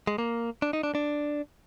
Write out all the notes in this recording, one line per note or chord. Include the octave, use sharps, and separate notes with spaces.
G#3
A#3
D4
D#4
D4
D4